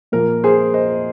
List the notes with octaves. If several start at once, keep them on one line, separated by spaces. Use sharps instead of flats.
A#2 F3 A#3 A#4
G#4 C5
C5 D#5